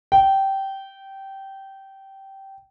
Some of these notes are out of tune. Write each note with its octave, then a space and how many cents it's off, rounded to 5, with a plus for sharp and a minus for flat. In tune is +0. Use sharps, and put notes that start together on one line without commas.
G5 -15